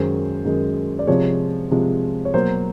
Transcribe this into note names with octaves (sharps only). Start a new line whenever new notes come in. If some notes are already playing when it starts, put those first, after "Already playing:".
Already playing: F#2 D#3 G#3 C5
F#2 D#3 G#3
D5
C3 F3 G#3 C#5
C3 F3 G#3
C#5
B2 F#3 A#3 C5